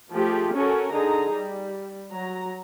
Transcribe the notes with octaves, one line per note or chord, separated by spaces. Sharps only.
F3 A3 G4 G#4
C#4 F#4 A4 A#4 C#5
D3 D#4 G#4 A#5
G3
F#3 A#5